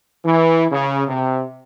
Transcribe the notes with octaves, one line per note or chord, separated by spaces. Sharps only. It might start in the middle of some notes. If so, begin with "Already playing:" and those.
E3
C#3
C3